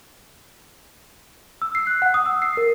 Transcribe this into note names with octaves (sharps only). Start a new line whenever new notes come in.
E6
C7
F#6
F#5
D#6
E6
C7
A#4